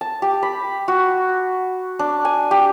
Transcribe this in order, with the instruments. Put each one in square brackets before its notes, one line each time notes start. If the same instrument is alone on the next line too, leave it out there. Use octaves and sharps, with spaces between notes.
[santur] A5
G4
B5
F#4
D4
G#5
G4